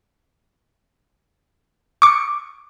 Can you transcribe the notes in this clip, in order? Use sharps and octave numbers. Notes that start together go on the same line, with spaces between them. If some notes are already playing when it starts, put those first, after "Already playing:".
C#6 D6